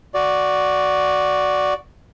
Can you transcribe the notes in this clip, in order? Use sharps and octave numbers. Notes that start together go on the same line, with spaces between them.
F#4 D5